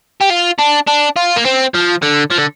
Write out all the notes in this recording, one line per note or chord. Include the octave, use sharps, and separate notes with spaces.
G4
F4
D4
D4
F4
A#3
C4
F3
D3
F3
D3